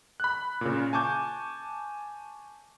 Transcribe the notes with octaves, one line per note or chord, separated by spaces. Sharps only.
B5 F#6
A#2 C#3
G#5 A5 C#6 D6 G6